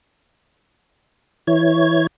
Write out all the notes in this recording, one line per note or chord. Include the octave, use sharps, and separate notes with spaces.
E3 E4 C#5 G#6